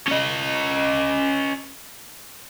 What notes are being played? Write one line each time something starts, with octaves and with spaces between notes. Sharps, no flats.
C#4 D#5